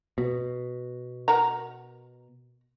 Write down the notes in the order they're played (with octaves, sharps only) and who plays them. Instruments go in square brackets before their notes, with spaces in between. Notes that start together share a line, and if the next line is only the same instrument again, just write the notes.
[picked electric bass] B2
[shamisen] A#4 F#5 A#5